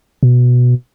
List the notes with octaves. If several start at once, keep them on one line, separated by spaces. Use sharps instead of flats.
B2